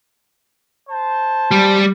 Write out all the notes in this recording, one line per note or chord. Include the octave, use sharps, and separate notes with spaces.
C5 A5
G3